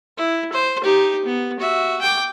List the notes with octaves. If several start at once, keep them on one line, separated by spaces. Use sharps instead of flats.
E4
C5
D#4 G4
B3
F#4 E5
G5 D6